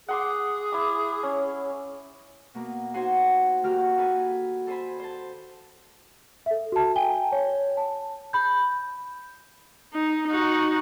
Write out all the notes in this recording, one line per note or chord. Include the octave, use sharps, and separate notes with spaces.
G#4 F#5 C6 D6
E4 D6
C#4
B2 A#3
D#4 F#4 C5 F#5 G#5 C6
D#3 A#3 F#4 G4 F6
D#4 A4 B4 G#5
A4 C5 G#5 B5
C5 A5
A4 E5
F#4 A5
G5 G#5 G7
C#5
A5
B5 G6
D#4
D#4 F#4